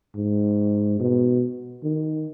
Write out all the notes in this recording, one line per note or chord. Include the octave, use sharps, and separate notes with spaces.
G#2
B2
D#3